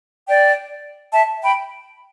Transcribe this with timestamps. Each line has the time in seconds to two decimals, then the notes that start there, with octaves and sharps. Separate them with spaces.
0.27 D5 G5
1.13 E5 A5
1.42 G5 B5